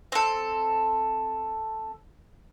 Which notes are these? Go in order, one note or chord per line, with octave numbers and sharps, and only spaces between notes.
C4 A4